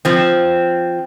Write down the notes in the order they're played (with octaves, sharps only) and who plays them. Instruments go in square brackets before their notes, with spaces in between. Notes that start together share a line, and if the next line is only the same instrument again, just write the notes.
[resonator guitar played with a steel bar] F3 C4